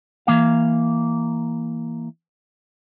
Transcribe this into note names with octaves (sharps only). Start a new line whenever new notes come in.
E3 A#3 F5